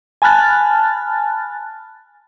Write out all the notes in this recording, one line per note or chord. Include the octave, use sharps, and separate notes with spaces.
G#5 A5 B5 F6 F#6 A6